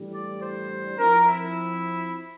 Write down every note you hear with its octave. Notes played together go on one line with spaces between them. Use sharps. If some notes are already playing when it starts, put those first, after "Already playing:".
Already playing: A2 E3 G3 D4
D5
C5
F3 C4 E4 A#4
E4